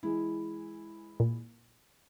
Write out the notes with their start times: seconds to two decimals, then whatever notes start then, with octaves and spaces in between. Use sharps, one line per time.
0.03 E3 G#3 E4
1.20 A#2